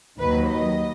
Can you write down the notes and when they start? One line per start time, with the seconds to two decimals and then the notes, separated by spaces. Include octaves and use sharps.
0.19 D#2 D#3 F#3 B4
0.47 D#5